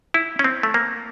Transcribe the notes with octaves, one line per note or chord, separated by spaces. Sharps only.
E4
C#4
C4
A3
A#3